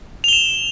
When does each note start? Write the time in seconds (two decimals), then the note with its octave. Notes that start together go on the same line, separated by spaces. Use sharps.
0.24 F7
0.28 G7
0.33 E7